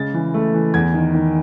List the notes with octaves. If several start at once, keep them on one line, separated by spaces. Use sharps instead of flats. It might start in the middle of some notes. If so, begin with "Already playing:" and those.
Already playing: C#3 G#3 A6
E3
A3
E3
E2 G#6
D#3
D#3